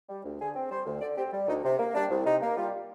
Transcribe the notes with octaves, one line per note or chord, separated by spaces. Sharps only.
G3
D2
D3 G#4
C4
G3 C5
D2
D3 D5
C4 G4
G3
D2 D#4
C3
A#3
G3 D4
C2
C3 D#4
A#3
G3 F4